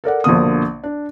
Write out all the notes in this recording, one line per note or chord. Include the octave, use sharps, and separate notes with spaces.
A4 A#4 D5 F#5
A#1 B2 D3 A#3 D#6
D4